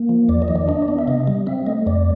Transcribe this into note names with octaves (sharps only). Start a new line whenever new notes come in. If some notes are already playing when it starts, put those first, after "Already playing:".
Already playing: A#3
F3
E2 D5
D#5
D#3
D5
D4 D#5
D5
B3
E5
C3 D#5
G3
C4 E5
A3 D#5
F2 D5